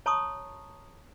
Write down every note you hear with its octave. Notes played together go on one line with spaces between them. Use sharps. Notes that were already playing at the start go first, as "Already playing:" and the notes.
C#5 A5 A#5 C6 C#6 D#6